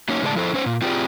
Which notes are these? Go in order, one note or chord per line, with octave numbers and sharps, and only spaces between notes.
F#3 A#3 C#4 D#4 C#5
A2 C#3 G#3 C5 D5 A5
F3 E4 A4 C5
C#4 C5 C#5
A#2
C4 F4 G4 G#4 B4 D5